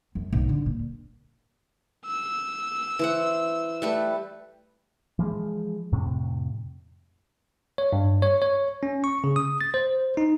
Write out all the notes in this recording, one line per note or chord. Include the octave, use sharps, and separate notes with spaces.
F#2
B1
D3
A#2
E6
E3 C5 F#5
G3 A3 B4
E3 F3 G#3
F2 A2 C3
C#5
G2
C#5
C#5
C#4
C#6
C#3
D#6
A6
C5
D#4